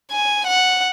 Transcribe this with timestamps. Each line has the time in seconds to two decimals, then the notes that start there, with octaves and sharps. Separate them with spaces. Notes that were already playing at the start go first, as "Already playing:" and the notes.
0.11 G#5
0.47 F#5